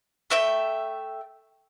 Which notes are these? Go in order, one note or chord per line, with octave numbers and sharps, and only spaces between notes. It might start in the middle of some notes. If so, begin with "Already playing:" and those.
A3 E5 G5